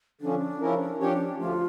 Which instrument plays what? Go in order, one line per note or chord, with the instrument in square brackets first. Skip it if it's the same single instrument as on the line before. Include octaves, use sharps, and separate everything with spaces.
[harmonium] D3 F3 C#4 [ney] D4
[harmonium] C#3 F3 C#4 E4 A#4
[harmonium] F3 C#4 G4 C#5 [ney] D4
[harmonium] D2 D3 F3 A3 [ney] F4